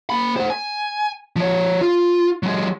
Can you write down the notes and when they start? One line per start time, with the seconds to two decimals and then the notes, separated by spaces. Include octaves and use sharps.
0.10 A#3 B5
0.37 C5 F#5
0.50 G#5
1.36 F3 C#5
1.81 F4
2.43 F#3 G#3